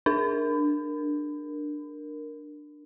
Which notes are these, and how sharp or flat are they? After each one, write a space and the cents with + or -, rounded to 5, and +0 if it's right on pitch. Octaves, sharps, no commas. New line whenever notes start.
D4 +15 A#4 +0